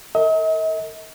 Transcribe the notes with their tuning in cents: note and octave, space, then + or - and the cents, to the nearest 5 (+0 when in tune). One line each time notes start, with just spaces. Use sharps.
A#4 -40 D#5 +45